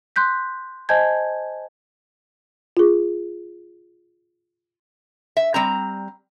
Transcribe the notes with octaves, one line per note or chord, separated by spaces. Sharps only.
C6 F#6 G6 B6
C5 D#5 G#5 A5 G6 G#6
F4 G#4
E5
G3 C4 A#5